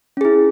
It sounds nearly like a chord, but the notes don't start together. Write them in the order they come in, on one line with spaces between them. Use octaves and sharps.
C#4 G#4 E4